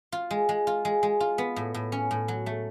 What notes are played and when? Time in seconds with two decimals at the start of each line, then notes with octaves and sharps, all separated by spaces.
0.12 F4
0.31 G#3
0.49 G#3
0.67 F4
0.85 G#3
1.03 G#3
1.20 F4
1.38 B3
1.56 A2
1.74 A2
1.92 C#4
2.11 A2
2.28 F#3
2.46 A3